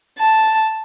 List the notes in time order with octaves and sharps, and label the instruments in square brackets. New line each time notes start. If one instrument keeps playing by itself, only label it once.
[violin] A5